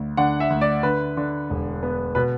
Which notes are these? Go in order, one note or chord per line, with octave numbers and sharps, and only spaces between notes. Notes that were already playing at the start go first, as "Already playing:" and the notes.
Already playing: D2 D3
D3 F#5
E5
D2
D5
D3 B4
D3
E1
B3
B2 B4